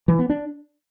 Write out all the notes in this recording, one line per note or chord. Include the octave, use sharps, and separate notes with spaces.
E3
B3
D4